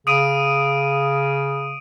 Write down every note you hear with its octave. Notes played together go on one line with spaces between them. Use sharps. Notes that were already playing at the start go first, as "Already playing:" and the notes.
C#3 D#6 D7 D#7